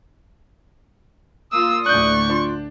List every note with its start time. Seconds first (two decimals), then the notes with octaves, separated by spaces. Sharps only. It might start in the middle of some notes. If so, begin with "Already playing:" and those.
1.52 A#3 F4 D#6 E6
1.86 D2 A2 D5 C#6 F#6 G6
2.29 D4 F4